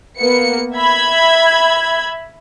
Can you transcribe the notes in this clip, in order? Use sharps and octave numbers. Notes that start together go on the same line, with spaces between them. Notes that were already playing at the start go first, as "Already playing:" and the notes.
A#3 B3 C#7
E5 B5 G#6